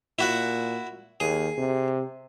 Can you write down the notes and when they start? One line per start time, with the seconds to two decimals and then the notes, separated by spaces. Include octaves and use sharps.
0.19 A#2 E4 F#4 F#5
1.20 D#2 G#4
1.58 C3